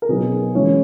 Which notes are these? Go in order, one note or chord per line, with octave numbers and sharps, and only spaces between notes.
A#4
B2 F#3 B3 D#4 G#4
E3 G#3 C#4 E4